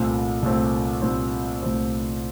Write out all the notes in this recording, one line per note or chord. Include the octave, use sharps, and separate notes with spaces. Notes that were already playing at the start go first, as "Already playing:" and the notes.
Already playing: C2 A#2 A3 C4
C2 A#2 A3 C4
C2 A#2 A3 C4
C2 A#2 A3 C4